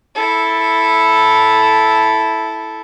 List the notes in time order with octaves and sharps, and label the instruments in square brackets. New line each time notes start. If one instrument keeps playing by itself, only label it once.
[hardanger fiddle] E4 A4